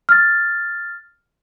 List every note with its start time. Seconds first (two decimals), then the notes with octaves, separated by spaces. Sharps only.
0.09 F6 A6